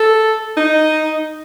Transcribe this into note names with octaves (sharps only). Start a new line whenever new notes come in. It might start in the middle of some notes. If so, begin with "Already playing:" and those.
Already playing: A4
D#4